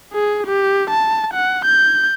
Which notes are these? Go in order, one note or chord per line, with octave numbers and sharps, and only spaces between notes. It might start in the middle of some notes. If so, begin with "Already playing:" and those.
G#4
G4
A5
F#5
G6